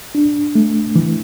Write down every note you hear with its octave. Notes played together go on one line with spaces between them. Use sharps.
D4
A3
E3